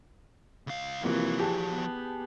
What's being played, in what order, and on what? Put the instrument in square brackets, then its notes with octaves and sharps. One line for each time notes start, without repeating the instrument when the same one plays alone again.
[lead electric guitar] C#2 F5
[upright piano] C3 A#3 F4 [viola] E3 [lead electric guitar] F3 F#4
[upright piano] G4 G#4 A5
[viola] B3